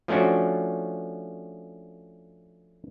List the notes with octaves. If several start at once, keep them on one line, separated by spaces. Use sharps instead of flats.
F3 A3 C#4 D4 F#4